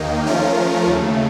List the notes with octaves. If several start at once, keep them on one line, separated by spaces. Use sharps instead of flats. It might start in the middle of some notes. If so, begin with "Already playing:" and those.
Already playing: D#2 D#3 A#3 D#4
F3 A3 C#4 F4 A#4
D#2 C#3 A3